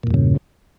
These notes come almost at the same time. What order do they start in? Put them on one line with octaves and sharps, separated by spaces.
A#2 E2 G2 C#3